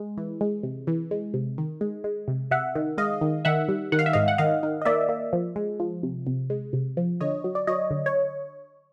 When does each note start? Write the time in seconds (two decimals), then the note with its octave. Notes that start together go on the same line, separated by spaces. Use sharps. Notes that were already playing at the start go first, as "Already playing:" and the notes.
Already playing: G#3
0.17 E3
0.41 G#3
0.63 C3
0.87 E3
1.11 G#3
1.34 C3
1.58 D#3
1.81 G#3
2.04 G#3
2.28 C3
2.51 C3 E5 F#5
2.75 D#3
2.98 G#3 D#5 F5
3.21 D#3
3.45 D#3 E5 F#5
3.68 G3
3.92 D#3 F#5
3.99 F5
4.06 E5
4.13 G#2 D#5 F5
4.28 F#5
4.38 D#3 D#5 F5
4.63 D#3
4.82 D#5
4.85 A#3 D5 E5
5.09 A#3
5.33 F3
5.56 G#3
5.80 F3
6.03 C3
6.27 C3
6.50 G#3
6.73 C3
6.97 F3
7.21 D3 C#5 D#5
7.44 F#3
7.55 D5
7.67 F#3 C#5 D#5
7.91 D3
8.06 C#5